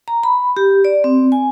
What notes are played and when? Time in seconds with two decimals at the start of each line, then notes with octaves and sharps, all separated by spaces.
0.08 A#5
0.24 B5
0.57 G4
0.85 D5
1.04 C4
1.32 G#5